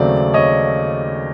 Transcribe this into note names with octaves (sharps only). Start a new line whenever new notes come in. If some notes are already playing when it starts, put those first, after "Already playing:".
Already playing: D#2 C#3 F#3 A3 C4 D5
C#5 D#5